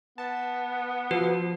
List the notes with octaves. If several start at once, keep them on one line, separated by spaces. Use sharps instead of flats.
B3 A5
F3 F#4 B4